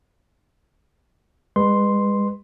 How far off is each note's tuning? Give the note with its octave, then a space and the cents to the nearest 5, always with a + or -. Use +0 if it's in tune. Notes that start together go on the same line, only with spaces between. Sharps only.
G#3 -40 B4 +0 C6 +0